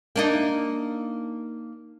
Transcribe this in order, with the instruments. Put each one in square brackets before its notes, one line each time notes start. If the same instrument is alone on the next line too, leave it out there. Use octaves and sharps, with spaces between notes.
[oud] A#3 D4 D#4